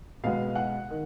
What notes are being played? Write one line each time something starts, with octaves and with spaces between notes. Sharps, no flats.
B2 G#3 B3 F5
F#5
D#3